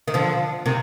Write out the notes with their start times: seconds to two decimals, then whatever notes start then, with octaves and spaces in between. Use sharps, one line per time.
0.08 D#3
0.14 D3 F3
0.66 C3 D#3